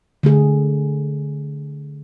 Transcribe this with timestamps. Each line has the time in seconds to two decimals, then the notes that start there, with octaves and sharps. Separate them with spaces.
0.23 D3 A3 G#4